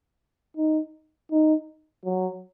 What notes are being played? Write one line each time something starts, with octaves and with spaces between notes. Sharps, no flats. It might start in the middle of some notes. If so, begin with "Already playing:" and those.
D#4
D#4
F#3